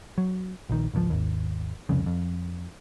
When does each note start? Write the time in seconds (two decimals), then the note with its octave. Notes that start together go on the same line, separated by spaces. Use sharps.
0.18 F#3
0.69 A#1 D#3
0.93 G#1 C#2 C#3 F3
1.10 G#1 D#2
1.89 C2 F2 C#3
2.06 F2